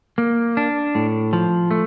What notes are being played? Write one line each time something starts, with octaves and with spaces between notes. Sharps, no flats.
A#3
D4
A2
F3
A3